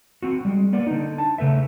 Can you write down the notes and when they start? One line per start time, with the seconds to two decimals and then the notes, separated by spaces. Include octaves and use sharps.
0.23 C4 F#4
0.45 G3 G#3
0.73 A#3 B3 D5
0.87 D3 D#4
1.18 A5
1.38 C#3 A3 B4 E5